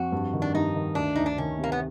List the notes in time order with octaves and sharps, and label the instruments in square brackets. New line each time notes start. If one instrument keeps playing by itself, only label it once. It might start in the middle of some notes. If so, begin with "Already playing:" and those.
Already playing: [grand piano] F2 [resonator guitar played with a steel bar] F#4
[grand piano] G2
D#3
[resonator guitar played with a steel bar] D4
[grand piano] G2 [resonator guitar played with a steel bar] D#4
[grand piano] D#3
[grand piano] D2 [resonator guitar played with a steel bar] D4
[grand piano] D2 [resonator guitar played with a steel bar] D#4
[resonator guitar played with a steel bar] D4
[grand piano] D#3 [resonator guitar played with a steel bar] C#4
[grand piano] C3
[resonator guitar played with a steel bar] A#3
B3